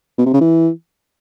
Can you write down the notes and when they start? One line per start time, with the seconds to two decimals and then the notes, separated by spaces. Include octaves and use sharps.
0.18 B2
0.26 C3
0.33 C#3
0.41 E3